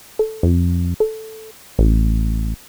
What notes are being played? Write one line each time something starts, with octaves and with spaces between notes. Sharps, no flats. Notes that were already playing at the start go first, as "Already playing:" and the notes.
A4
F2
A4
A1